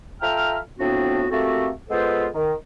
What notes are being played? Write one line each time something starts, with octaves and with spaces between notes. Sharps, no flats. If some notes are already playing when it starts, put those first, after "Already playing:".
F4 A4 E5 G5 A#5 F6
A2 F3 B3 C4 D4 F#4
A3 A#3 C4 F#4 G4 A4
G#3 B3 F4 A4 B4 C5
D#3